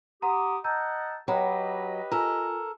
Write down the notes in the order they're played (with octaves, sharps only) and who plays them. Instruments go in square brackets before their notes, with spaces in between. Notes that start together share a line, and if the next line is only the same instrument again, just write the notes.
[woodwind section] G4 D#6 [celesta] F#5 A#5 C6
[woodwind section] D#5 F#5 A5 [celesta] A#5 E6 G6
[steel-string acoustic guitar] F#3 [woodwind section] G4 B4 D#5 [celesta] G5 B5
[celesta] F4 G#5 [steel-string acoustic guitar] A4 A#4